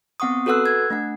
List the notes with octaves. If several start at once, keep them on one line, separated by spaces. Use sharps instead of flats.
B3 C4 F#5 C#6 D#6
F#4 A4 B4 F#5 E6 F#6
G#6
A3 D4 F#5